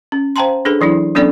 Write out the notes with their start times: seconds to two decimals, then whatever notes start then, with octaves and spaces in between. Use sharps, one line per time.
0.12 C#4
0.36 C5 F5 G5 A5 A#5 C6
0.65 D4 G#4 A4 B4
0.81 E3 F#3 D4 E4
1.15 F#3 B3 C#4 D4 A4 D5